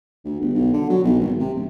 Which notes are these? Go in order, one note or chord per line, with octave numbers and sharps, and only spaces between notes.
D2
G1
B1
D3
F#3
B1
G#1
C3
D1